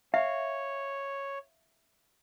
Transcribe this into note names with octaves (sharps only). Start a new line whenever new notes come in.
C#5 E5 F5